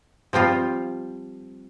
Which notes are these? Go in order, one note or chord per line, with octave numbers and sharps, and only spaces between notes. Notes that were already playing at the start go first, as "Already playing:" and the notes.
F3 G3 C4 F4